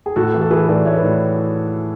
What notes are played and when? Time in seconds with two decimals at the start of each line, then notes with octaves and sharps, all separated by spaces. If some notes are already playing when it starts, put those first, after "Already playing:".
0.06 G#4
0.16 A2 F#4 A4
0.34 E3
0.41 A4
0.51 E3 G#4 B4
0.68 A2 B4 D5
0.85 A2 C#5 E5
0.97 B4 D5
1.03 A2